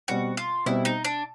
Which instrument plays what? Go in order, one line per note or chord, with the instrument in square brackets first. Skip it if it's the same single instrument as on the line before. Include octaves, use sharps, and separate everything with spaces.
[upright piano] B2 G3 C4 [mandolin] F#4
[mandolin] F4
[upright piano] B2 G3 C4 [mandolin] E4
[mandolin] D#4
D4